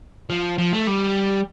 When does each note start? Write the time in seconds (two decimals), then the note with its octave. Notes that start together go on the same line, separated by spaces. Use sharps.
0.30 F3
0.58 F3
0.73 A3
0.87 G3